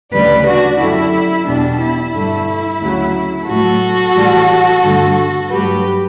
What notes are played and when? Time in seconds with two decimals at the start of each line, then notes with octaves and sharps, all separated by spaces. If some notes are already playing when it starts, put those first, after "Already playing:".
0.12 D2 C#3 E3 G3 B4 D5
0.46 D4 F#4
0.80 F#2 D3 G3 E4
1.46 E2 B2 G3 D4
1.81 E4
2.13 G2 D3 A3
2.81 D2 C#3 F#3
3.47 A2 F#3 A3 F#4 A4
4.15 A2 E3 G3
4.83 G2 D3 A3
5.49 G2 F#3 A3 G4 B4